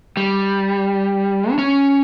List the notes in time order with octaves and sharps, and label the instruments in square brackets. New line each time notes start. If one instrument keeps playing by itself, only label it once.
[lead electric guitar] G3
D4
C#4